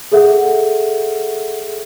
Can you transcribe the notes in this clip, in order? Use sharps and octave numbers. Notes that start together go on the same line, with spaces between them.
G#4 A4 E5 F#5